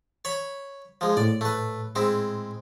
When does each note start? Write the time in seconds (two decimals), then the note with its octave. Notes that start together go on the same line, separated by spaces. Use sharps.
0.25 C#5 B5
1.01 F3 G#3
1.17 A2 D5
1.41 A3 B4
1.96 G#3 C4 E4